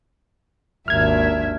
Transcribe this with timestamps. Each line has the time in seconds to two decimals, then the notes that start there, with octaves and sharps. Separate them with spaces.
0.88 G#1 D#2 D4 E5 F6 G#6